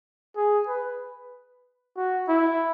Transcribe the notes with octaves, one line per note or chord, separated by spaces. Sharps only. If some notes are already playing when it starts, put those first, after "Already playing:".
G#4
B4
F#4
E4